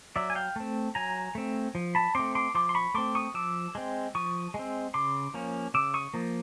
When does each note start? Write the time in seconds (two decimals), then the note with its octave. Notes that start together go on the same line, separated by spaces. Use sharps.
0.16 F#3 D5 E5
0.30 G#5
0.35 F5 G5
0.56 A3 C4
0.95 F#3 G#5 A#5
1.35 A3 C4
1.75 F3
1.95 A5 B5
2.15 A3 C4 C6 D6
2.35 C6 D6
2.55 F3 C6 D6
2.69 C6
2.75 B5 C#6
2.94 A3 C4 C6 D6
3.15 C#6 D#6
3.34 F3 D6 E6
3.75 G#3 C4
4.15 F3 C#6 D#6
4.54 G#3 C4
4.94 C#3 C6 D6
5.34 F3 A#3 C#4
5.74 C#3 D6 E6
5.94 C#6 D#6
6.14 F3 A#3